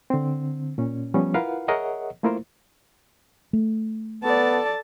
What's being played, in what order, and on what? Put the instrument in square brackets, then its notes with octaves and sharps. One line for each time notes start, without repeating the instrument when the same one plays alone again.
[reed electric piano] D3 C4
A#2 C#4
F3 G3 B3 C#4
E4 F4 A#4 B4 F5 F#5
G#4 A#4 C#5 D#5 E5 F#5
A3 A#3 E4 F4 A#4 C5
[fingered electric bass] A3
[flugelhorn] B3 [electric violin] A4 [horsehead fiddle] D5 A5